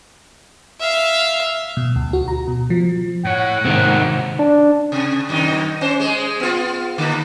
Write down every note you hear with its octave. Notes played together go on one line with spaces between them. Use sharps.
E5 F5
B2
D2
F#4
A#5
B2
F3
A2 C#5 F#5
G#2 C3 D#3 C4
D4
C3
F#2 D#3 D#4
C#4 C5
G#3 G#4
B3 F4
D3 A#3